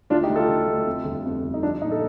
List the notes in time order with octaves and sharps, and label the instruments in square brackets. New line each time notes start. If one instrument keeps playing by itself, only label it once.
[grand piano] D2 D4 F4
D#4 G4
D2
F4 A4
D2
D2
F2
G1
F2
G1
D#4
F3 D4
A#2 D#4
A4